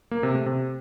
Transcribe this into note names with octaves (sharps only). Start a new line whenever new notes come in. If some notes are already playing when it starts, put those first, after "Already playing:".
A#3
C3
A3
C3